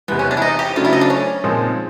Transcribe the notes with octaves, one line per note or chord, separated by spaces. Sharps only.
E2 C3 E3 G#3 B3
C#4
D4
E4
D#4
G4
C#3 F#3 A3 D4 F4
E4
D#4
D4
C#4
A#2 F3 G#3 C4 D#4